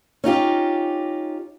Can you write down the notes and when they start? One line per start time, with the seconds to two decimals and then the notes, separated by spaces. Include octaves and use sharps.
0.24 C#4 D#4 F4 G4